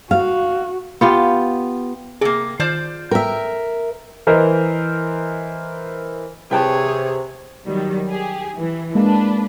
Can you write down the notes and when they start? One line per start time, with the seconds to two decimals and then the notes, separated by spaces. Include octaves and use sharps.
0.11 F#4 F5
1.01 B3 F4 G4
2.21 C3 A#3 G#4
2.60 D#3 F4 C5 D5
3.11 A#4 E5 G5
4.27 E3 A#4 C5 D#5
6.51 C3 G#4 B4 C#5 G5 A5
7.66 D#3 F#3 G3
8.09 G4 G#4
8.56 E3
8.95 G#3 A#3 D4 B4